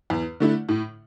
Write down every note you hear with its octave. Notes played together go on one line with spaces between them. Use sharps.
E2
D3 A3 E4
A2